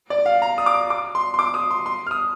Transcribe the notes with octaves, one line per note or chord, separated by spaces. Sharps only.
D5
F5
A#5
D#6
D6
D6
C6
C6
D6
D#6
C6
C6
F6
D#6